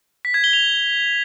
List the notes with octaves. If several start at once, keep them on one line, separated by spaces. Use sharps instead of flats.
B6
G#6
G7
F7